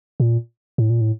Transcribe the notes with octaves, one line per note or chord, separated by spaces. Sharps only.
A#2
A2
A#2
A2